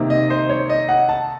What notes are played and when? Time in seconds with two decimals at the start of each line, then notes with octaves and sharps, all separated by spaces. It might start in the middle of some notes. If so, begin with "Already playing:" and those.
Already playing: C3 D#3 A#3
0.10 D#5
0.30 C5
0.50 C#5
0.69 D#5
0.89 F#5
1.09 A5